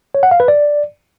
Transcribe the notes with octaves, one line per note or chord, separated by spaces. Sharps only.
C#5
F#5
F5
B4
D5